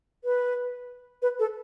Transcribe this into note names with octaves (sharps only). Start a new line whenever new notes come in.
B4
B4
A4